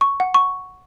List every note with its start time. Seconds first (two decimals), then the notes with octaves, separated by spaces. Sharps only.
0.01 C#6
0.20 F#5
0.34 C#6